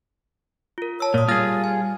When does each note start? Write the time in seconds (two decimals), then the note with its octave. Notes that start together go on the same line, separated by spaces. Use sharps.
0.78 F4 A#4
1.00 C#5 A5 E6
1.14 A#2 A#4 D#6
1.28 G3 F4 G#4 D#6 A#6
1.64 G#5